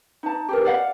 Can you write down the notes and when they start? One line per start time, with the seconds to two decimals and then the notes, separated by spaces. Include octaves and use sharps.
0.23 D#4 A5
0.49 G4 G#4 A#4
0.65 D5 F5 F#5